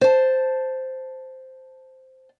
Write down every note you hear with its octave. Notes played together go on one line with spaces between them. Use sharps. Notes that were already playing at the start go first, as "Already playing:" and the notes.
C5 A5